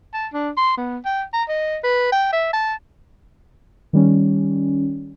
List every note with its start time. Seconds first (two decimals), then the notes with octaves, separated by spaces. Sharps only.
0.14 A5
0.33 D4
0.57 C6
0.78 B3
1.05 G5
1.33 A#5
1.49 D#5
1.84 B4
2.12 G5
2.33 E5
2.53 A5
3.93 D#3 G3 C#4